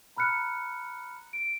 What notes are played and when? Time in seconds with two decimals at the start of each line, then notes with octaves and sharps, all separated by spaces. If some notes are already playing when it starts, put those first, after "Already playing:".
0.16 A#5 B5 F6 F#6 C#7
1.33 D7